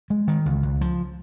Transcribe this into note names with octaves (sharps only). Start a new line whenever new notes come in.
G#3
D#3
C#2
C#2
F3